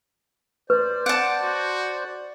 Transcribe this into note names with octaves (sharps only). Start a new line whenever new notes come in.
B4 C5 D5
F#5 A5 D6
F#4